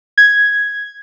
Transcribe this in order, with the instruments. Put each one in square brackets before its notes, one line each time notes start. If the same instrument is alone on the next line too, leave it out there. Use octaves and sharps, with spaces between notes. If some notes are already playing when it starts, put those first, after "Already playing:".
[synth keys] G#6